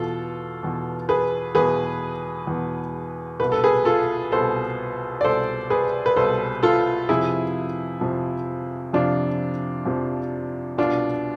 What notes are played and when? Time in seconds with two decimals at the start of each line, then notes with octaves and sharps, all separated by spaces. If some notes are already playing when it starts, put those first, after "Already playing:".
Already playing: E2 B2 F4 A4
0.63 E2 B2
1.09 G#4 B4
1.55 E2 B2 G#4 B4
2.47 E2 B2
3.39 C2 B2 B4
3.52 A4
3.64 G#4 B4
3.85 F4 A4
4.32 C2 B2 A4 C5
5.21 D5
5.24 C2 B2 A4 C5
5.70 G#4 B4
6.06 B4
6.16 C2 B2 A4 C5
6.63 F4 A4
7.09 F2 C3 F3 E4 G#4
8.01 F2 C3 F3
8.93 F2 C3 F3 D4 F4
9.86 F2 C3 F3
10.78 C2 B2 D4 F4